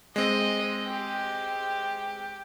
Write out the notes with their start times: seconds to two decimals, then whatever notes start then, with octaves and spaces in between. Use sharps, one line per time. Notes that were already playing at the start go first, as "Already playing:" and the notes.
0.16 G#3 C4 D#5
0.88 G4